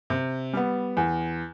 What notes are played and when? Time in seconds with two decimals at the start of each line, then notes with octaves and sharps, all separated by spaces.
0.10 C3
0.53 G3 B3
0.97 E2